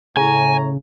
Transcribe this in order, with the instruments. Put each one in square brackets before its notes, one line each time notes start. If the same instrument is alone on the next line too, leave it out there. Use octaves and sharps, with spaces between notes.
[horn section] A2 C#5 A#5 [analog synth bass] C#3 [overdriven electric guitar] G#5